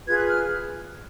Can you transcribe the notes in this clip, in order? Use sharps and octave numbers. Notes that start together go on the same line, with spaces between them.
F4 G#4 B4 G#6
F#6
F6